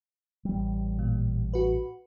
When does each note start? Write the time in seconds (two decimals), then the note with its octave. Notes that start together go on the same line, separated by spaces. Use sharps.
0.45 A1 G3
0.99 A#2
1.53 F#4 B4